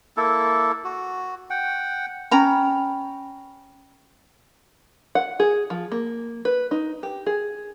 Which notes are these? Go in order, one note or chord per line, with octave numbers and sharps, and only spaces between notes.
A#3 E4 A4
F#4
F#5 G5
C#4 G5 A#5 B5
F#5
G#4
F3
A#3
B4
D#4
G4
G#4